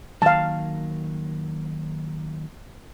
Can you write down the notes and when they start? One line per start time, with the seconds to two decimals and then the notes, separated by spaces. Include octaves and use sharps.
0.22 D#3 F#3 A#3 F5 A5